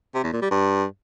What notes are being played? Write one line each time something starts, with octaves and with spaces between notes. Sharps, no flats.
C3
E2
A#2
G3
G2